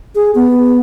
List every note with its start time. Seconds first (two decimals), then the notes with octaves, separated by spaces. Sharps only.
0.15 G#4
0.35 B3